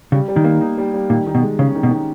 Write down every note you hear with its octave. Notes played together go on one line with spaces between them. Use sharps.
C#3 G3
G3
D#3
A#3
D#4
G3
G3
A#2 D#3
D#3
B2
G#3
C#3 C#4
D#3
B2
D#3